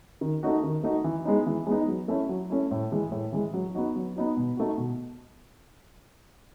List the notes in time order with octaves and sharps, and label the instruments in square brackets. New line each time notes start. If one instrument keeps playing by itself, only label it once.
[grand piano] D#3
A3 D#4 F#4
D#3
A3 D#4 F#4
E3
G#3 B3 D#4
E3
G#3 B3 D#4
F#3
A3 C#4 E4
F#3
A3 C#4 E4
A2
E3 G#3
A2
E3 G#3
F#3
B3 D#4 F#4
F#3
B3 D#4 F#4
B2
A3 D#4 F#4
B2